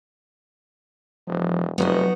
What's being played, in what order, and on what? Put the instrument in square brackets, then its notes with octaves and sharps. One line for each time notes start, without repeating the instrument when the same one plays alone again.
[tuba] E1 [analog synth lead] F3
[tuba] F1 [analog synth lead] F#3 [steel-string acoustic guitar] B3 D#4 F#4